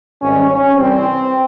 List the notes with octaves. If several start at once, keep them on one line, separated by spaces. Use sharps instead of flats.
G#1 G#2 G3 C#4
C#4
C2 C3 E3 G3 C4